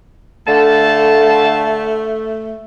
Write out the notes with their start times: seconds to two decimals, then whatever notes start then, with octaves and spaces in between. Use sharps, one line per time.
0.48 D3 A3 F5 A5